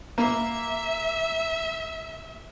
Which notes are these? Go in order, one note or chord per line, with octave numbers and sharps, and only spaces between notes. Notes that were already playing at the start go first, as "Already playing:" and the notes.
A#3 E5